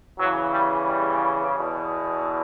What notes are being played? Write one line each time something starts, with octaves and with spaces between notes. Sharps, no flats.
E2 C#3 E3 F#3
G3
G3
E2 B2